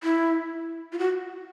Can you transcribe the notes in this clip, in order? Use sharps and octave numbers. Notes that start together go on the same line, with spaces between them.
E4
F4
F#4